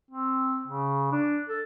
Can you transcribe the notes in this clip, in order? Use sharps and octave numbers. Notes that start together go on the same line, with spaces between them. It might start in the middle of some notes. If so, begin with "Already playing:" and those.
C4
C#3
D4
A4